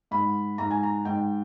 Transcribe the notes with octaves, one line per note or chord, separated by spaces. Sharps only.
G#2 B5
G#2 A#5
G#5
A#5
G#2 G5